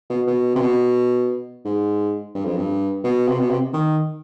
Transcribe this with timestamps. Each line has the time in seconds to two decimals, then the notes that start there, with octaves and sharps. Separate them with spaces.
0.10 B2
0.27 B2
0.55 C3
0.61 B2
1.65 G#2
2.35 G2
2.45 F2
2.57 G2
3.04 B2
3.28 C3
3.39 B2
3.50 C3
3.73 D#3